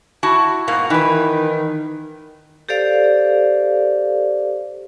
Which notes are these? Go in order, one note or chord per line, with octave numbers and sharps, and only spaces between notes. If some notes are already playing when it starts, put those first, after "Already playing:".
E4 F#4 A5
G#2 B2 A#3
D#3 E3 B4
G4 A4 C5 D5 F5